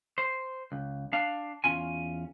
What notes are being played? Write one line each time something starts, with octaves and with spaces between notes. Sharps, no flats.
C5
C#2
D4 F5
E2 D3 C#4 F4 G#5